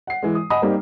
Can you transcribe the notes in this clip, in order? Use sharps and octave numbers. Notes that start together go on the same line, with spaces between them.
F#5 C7
E3 G#3
D#6
D#5 F#5 G#5 B5 D#6
G3 A#3 C4 D#4 G4